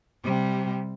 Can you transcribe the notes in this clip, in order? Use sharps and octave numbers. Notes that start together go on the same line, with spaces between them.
C3 G3